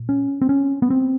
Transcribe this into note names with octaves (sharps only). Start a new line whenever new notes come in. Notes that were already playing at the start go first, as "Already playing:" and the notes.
Already playing: A#2
C#4
C4
C#4
B3
C4